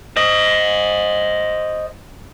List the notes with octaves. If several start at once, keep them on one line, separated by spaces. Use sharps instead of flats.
C5 D#5